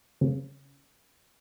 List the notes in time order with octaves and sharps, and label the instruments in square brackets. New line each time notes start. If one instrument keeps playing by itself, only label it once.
[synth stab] C#3